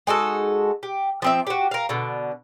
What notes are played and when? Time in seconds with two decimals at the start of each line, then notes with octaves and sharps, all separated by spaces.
0.07 G#3 D#4 F#4 A4
0.83 G4
1.22 F3 C4 E5
1.47 F#4 G4
1.71 A#4 F5
1.89 B2 D3